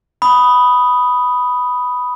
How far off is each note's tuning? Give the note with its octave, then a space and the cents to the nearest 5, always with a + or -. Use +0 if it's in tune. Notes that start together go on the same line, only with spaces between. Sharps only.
B5 +0 D#6 +0